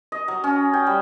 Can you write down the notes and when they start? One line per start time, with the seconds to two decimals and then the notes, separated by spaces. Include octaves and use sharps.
0.12 D#5
0.28 F#3
0.44 C#4
0.74 G5
0.87 G3